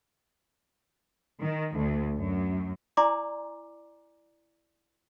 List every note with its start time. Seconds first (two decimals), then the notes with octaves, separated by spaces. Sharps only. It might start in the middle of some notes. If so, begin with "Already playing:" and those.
1.43 D#3
1.77 D2
2.17 F#2
2.97 E4 D5 G#5 A#5 C6 D6